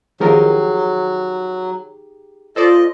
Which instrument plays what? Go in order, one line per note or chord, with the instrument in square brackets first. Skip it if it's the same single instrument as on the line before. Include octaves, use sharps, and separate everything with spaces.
[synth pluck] D#3 F3 A#4 [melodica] F#3 [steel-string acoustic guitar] D#4 G4 G#4
[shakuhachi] F4 [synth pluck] A4 C5 D5 [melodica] D#5